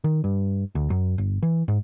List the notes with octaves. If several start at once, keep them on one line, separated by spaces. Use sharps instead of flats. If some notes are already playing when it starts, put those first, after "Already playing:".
D#3
G2
D2
F#2
G1
E3
G#2